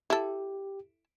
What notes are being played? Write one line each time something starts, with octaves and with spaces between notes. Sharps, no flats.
E4 G4 A4